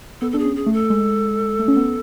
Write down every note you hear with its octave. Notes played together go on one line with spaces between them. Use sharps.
B3 A4
A4
D4 G#4
C#4
G#4
A3
A4
G#3
A3
C#4
B3